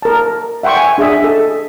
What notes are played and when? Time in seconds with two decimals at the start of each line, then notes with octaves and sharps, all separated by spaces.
0.02 A#4 A5
0.63 E5 F#5 G5 C6 C#6
0.77 G#5
0.98 D4 G#4 D#5 E5 D#6
1.24 A4